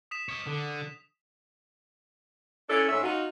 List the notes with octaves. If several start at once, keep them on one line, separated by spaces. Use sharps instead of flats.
D#6 B6 E7
C#5 D#5
D3
C#4 D4 E4 A4
G#2 A3 C#4 E5
D#4 F4 F#4